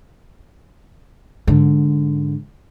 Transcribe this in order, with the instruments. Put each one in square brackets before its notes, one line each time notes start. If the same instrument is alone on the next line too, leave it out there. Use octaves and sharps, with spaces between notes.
[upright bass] G#2 D3